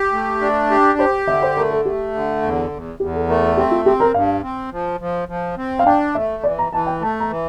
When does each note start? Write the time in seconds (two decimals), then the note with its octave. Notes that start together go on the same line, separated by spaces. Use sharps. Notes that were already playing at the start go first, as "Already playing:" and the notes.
Already playing: G4
0.12 A3
0.41 D4
0.71 G4
0.98 G4 C5
1.27 D3 E5
1.42 C5
1.56 A3 A#4
1.70 A4
1.85 A3 G4
2.14 D3
2.42 E2
2.71 E2
2.99 E2 G4
3.14 A4
3.28 A3 A#4
3.43 A4
3.57 C4 G4
3.71 F4
3.85 C4 G4
4.00 A#4
4.14 G2 F5
4.43 C4
4.72 F3
5.00 F3
5.28 F3
5.57 C4
5.79 F5
5.86 D4 G5
6.15 A3 E5
6.43 E3 D5
6.58 A#5
6.72 E3 A5
6.87 G5
7.01 A3 A5
7.20 A#5
7.29 E3